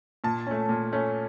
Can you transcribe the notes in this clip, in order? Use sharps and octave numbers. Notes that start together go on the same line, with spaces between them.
A#2 A5
A3 C#4
A#2
A3 C#4